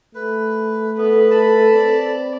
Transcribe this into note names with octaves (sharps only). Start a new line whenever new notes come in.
A3 B4
B3 A4 B4
A5 B5
C4 D5